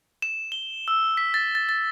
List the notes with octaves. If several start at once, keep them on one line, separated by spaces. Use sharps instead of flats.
E7
G7
E6
B6
A6
A6
A6